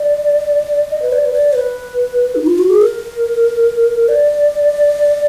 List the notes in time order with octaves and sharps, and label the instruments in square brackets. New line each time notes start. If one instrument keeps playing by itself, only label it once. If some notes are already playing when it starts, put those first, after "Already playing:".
Already playing: [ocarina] D5
D#5
B4
D5
B4
D5
B4
D#4
F4
F#4
G#4
A#4
D5